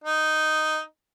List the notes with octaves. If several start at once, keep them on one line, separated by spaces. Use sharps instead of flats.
D#4